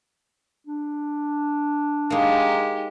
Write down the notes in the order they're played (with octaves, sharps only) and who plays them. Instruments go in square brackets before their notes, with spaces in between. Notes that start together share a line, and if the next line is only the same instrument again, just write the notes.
[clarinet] D4
[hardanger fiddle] G#3 G4 [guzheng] A#3 D#4